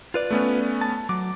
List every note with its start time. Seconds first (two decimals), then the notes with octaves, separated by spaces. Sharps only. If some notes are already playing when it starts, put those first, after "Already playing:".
0.14 F4 B4 D5
0.30 A3 B3 C#4
0.81 A5
1.09 F#3 D6